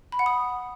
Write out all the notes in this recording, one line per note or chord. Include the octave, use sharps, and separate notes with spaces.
B5
F#5
D#6